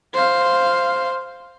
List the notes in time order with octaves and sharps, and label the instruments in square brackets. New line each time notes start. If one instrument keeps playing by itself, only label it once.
[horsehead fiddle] C5 F5